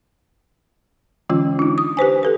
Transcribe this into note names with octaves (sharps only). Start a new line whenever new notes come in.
D3 E3 G#3 C#4 F4
D4 D#4
D#6
G4 B4 C5 G#5
G4 A4 B4